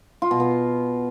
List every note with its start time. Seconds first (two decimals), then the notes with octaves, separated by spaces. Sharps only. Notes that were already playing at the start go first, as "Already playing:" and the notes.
0.22 F4
0.31 B2
0.40 B3